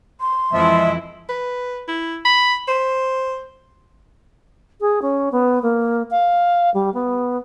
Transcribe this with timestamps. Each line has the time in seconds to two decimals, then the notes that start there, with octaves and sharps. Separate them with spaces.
0.21 C6
0.53 F2 E3 F3 G#3 E4 E5
1.29 B4
1.88 E4
2.25 B5
2.68 C5
4.80 G#4
5.02 C#4
5.32 B3
5.62 A#3
6.10 F5
6.74 G3
6.94 B3